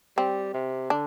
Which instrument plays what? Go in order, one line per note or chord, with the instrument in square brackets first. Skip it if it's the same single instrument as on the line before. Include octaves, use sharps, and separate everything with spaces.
[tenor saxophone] G3 [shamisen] C4
[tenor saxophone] C3
[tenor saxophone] D3 [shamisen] D4